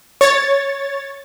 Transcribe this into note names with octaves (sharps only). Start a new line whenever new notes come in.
C#5 A6